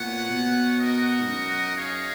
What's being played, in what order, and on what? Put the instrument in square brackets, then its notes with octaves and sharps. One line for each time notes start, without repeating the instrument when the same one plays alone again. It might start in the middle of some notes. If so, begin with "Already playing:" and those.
Already playing: [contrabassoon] A#2 [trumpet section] B3 F#4 C#5 F#5
[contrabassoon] B2
[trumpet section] D#4 F#4 A#4 D#5 F#5
[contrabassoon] G#2
F#2
[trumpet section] D#4 G#4 C#5 F5